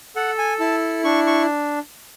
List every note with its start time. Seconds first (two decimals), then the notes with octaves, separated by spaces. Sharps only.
0.16 A4 F#5
0.38 G#5
0.60 E4 A5
1.04 D4 C#6
1.27 C#6